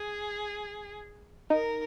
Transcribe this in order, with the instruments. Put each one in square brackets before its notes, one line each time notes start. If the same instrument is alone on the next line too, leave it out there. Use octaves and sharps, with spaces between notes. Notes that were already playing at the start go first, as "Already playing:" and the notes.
Already playing: [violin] G#4
[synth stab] D#4 [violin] A#4